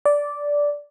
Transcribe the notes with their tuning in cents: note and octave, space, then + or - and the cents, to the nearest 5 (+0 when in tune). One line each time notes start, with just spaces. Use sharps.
D5 -10